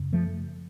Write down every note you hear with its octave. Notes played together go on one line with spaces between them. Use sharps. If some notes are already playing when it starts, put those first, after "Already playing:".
Already playing: F#2 C#3
F3 A3